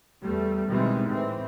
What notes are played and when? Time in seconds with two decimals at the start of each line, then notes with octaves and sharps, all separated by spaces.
0.22 E2 G3 A3
0.68 B2 D#3 E3 G3 G#3 C4
1.07 A2 E3 C4